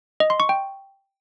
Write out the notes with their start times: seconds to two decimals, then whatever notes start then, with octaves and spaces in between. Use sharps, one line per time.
0.20 D#5
0.30 C6
0.40 C#6
0.49 G5